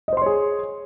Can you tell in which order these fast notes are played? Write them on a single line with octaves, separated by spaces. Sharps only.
D#5 C5 C6 C#5 G#4